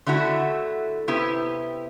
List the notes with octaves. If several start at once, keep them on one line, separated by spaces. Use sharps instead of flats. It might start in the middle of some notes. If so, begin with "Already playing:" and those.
D3 A3 E4 F#4 E5
C3 B3 E4 G4